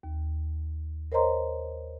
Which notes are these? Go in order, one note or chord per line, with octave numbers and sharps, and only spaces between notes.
D#2
A#4 C5 C#5 D#5 A#5 C6